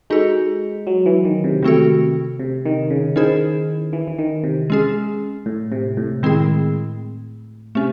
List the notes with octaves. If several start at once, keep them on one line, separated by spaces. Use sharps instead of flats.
G#3 D#4 F#4 A4
F#3
E3
D#3
C3
C3 D#3 A3 C4 F#4 A4
C3
D#3
C#3
D#3 C#4 E4 G#4 C5
E3
E3
D#3
C3
G#3 C#4 G#4
A2
C3
A2
D#3 G#3 C4 E4 G#4
C3 A3 C#4